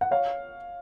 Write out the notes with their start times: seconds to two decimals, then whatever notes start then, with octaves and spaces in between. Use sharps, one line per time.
0.01 F#5
0.11 C#5 F5